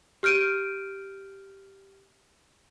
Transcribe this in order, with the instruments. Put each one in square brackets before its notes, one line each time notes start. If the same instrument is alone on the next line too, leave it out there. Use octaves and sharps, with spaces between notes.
[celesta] G4 F6 G6 D7 D#7